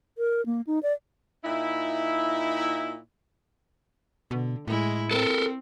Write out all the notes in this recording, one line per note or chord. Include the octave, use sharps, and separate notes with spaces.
A#4
A#3
D#4
D5
A#2 D#4 E4
B2 D3
A2 G#3 E4
C4 A4 A#4